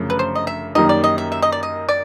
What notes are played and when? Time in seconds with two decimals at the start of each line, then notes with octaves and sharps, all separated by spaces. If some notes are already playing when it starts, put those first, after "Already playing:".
Already playing: G1 F#2 C#3 F3 A3
0.10 B4
0.19 C5
0.35 D#5
0.47 E5
0.75 F#2 D#3 G3 A#3 D#4 D#5
0.89 D5
1.04 D#5
1.18 E5
1.32 E5
1.42 D#5
1.52 D5
1.63 D#5
1.89 D5